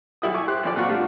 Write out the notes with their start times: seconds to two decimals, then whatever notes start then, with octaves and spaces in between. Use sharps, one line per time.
0.22 B1 G3 E4 F#4 D#6
0.34 G#5 C#6 D6
0.48 G4 C5 F#6
0.63 B1 F3 D5
0.76 A#2 F#3 C4 F4 F#5 C#6
0.89 G3 A3 D4 F4 F#4